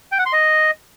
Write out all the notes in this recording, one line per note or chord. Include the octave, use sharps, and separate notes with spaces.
G5
F#5
C6
D#5